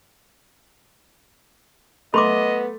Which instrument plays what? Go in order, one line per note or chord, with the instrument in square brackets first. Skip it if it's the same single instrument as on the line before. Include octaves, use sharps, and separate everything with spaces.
[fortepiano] A3 [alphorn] B3 [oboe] D#5 [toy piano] B5 C6 D6